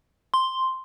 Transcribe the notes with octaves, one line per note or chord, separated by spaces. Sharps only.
C6